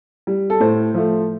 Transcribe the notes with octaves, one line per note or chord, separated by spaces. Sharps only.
G3
A4
A2 C5
F3 A3